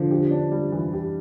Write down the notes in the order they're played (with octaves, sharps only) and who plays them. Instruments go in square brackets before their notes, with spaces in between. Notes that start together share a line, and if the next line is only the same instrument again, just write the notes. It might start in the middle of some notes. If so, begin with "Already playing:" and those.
Already playing: [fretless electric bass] D3 F3
[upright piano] G4
D4
G3
E3
G4